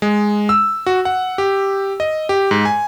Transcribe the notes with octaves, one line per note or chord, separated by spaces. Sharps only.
G#3
E6
F#4
F#5
G4
D#5
G4
G#2
G#5